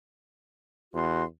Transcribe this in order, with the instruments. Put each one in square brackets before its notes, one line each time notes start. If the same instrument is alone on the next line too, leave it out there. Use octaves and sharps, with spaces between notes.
[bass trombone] E2 [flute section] F#4 C6